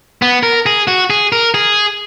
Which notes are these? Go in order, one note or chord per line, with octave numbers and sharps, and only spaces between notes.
B3
A#4
G#4
F#4
G#4
A#4
G#4